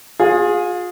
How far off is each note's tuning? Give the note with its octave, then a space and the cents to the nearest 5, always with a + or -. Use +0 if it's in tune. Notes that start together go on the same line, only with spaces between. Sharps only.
F4 +35 G#4 +0